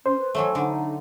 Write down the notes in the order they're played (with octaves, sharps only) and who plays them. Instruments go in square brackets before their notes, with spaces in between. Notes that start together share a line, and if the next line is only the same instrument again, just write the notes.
[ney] C#4 [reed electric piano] C5
[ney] B4
[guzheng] E3 F#3 A3 [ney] C#5
[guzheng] D3 [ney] D#4